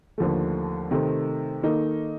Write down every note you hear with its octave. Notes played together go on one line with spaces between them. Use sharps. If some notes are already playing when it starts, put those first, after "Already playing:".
D#2 D3 F3 A3
C3 D#3 A3 C4
D#3 A#3 D#4 A4